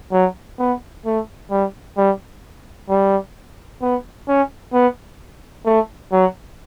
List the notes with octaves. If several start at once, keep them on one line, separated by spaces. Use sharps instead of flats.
F#3
B3
A3
G3
G3
G3
B3
C#4
B3
A3
F#3